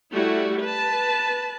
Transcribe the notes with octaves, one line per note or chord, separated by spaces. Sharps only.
G3 A3 E4 F#4
B4 A5